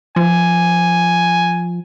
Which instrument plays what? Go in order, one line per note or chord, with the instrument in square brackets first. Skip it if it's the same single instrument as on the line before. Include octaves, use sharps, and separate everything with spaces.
[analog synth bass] F3 [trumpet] G#5